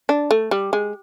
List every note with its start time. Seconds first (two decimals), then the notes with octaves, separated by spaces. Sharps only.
0.09 D4
0.31 A3
0.51 G3
0.73 G#3